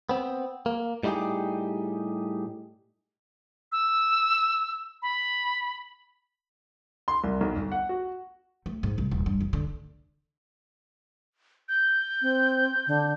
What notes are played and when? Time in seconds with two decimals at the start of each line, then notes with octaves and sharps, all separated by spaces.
0.09 B3 C4
0.66 A#3
1.03 A2 G3 D#4 F4 G4 G#4
3.72 E6
5.02 B5
7.08 C6
7.24 C2
7.41 B1
7.56 G1
7.72 F#5
7.89 F#4
8.66 A3
8.83 G#2
8.98 C2
9.11 D#1
9.26 G2
9.40 F2
9.53 D3
11.69 G6
12.22 C4
12.87 D3